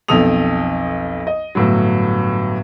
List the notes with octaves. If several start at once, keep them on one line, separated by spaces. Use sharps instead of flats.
B1 F2 F3 A4 D#6 F7
D#5
G1 A2 F#3